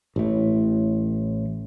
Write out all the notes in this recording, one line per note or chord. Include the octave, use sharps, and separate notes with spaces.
A1 A2